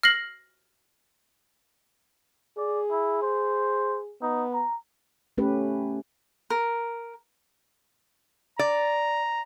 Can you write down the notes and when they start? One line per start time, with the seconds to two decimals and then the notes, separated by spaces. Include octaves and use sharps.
0.03 F6 A#6 C7 F#7
2.58 G#4 D5
2.91 E4
3.22 C5
4.21 B3 D#4
4.54 A#5
5.38 A3 C#4 G4 B4
6.50 A#4
8.59 D5 A#5